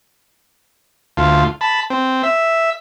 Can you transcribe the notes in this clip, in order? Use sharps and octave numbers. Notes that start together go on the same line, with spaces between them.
D2 F4
A5 B5
C4
E5